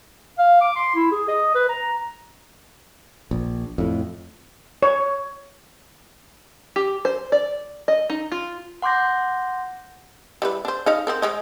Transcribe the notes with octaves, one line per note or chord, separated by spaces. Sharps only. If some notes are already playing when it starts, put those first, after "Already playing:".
F5
D6
C6
E4
G#4
D#5
B4
A#5
A#1
F2 A2
C#5
G4
C5
D5
D#5
D#4
F4
F#5 C6 D6 G6 A#6
G3 E4 B4
D4 C5
D#4 D#5 F5
C4 G#4 A#4
G#3 C#5 D#5